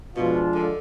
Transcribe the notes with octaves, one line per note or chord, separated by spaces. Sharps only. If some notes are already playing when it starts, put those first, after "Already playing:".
B2 F3 G#3 D4 F4
D3